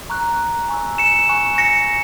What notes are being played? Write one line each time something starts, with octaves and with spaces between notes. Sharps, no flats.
A#5 C#6 F#6
G#5 C#6 E6
C#7 E7
G#5 C#6 F#6
A#6 C#7